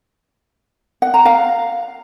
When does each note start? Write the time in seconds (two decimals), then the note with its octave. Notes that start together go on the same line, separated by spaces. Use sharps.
1.02 F#5
1.14 A#5
1.25 F5